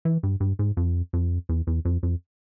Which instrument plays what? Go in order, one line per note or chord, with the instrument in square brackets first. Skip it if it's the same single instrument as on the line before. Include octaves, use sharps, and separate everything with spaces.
[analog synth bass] E3
G2
G2
G#2
F2
F2
E2
E2
F2
F2